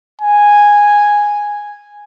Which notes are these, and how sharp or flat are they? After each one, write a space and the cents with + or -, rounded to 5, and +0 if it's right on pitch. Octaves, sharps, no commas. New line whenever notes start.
G#5 -5